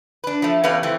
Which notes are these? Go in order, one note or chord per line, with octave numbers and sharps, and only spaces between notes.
D4 B4
F3 A3
E2 A3 C#4 G4 B4 F5
E3 A3 C4